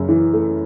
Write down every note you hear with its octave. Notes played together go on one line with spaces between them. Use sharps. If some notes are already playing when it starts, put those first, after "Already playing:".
Already playing: F#2 C#3
E3
A3